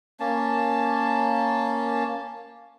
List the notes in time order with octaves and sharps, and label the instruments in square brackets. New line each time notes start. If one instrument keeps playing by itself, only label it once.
[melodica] A#3 C#4 A5